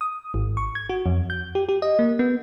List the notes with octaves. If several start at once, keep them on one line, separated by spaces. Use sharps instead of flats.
D#6
G#1
C#6
G#6
F#4
F2
G6
G4
G4
D#5
A#3
B3